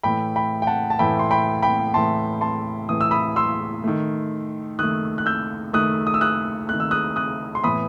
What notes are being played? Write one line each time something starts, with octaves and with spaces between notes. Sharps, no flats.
A2 E3 A3 G5 B5
G5 B5
G5
F#5 A5
A5
A2 E3 A3 G5 B5
C6
G5 B5
G5 B5
A2 E3 A3 A5 C6
A5 C6
A2 E3 A3 D#6
E6
B5 D#6
C6 E6
D#3 A3
D#3 A3 D#6 F#6
F#6
E6 G6
D#3 A3 D#6 F#6
D#6
E6
D#6 F#6
D#3 A3 F#6
E6
D#6 F#6
D#6 F#6
C6
A2 E3 B3 B5 D#6